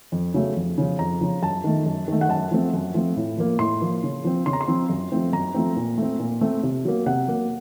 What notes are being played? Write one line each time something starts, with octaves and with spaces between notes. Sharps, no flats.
F2
C#3 F#3 A3
F2
C#3 F3
F2 A#5
C#3 F3
F#2 A5
D#3 A3
F#2
D#3 A3
F#5
F#2 A5
F3 A3 C4
F#2
F3 A3 C4
A2
F3 A#3
A2 C6
F3 A#3
C#3
F3 C4
C#3 C6
A#5
C6
F3 C4
F#2
F3 A3 C4
F#2 A#5
F3 A3 C4
A#2
A3 C4
A#2
A3 C4
C3
F#3 A#3
C3 F#5
F#3 A#3